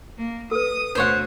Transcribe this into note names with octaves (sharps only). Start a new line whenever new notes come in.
A#3
A4 B4 D#6
D2 B2 C5 C#5 F#5